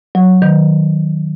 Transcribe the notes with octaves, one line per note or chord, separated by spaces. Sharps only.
F#3
D#3